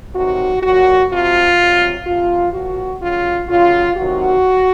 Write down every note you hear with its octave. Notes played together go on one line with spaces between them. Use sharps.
C3 D#3 F#3 F#4
A#2 F#3 F#4
C3 F3 F4
C3 F#3
C3 F3 F4
A#2 F3 F#4
C#3 F#3 F4
C#3 F#3 F4
C3 D#3 F#3 F#4